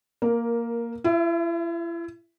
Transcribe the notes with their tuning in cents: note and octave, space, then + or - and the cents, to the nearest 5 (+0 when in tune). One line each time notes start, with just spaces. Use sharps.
A#3 +0 A#4 +15
E4 +40 E5 +0